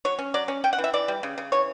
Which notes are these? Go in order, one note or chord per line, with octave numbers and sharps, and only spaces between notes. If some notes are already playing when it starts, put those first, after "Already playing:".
F#3 C#5
C#4
F#3 D5
C#4
C#4 G5
F#5
E3
E5
E3 D5
G3
C#3
C#3
E3 C#5